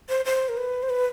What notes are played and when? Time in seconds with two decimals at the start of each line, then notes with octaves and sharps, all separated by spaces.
0.09 C5
0.25 C5
0.49 A#4
0.57 B4
0.83 C5
0.90 B4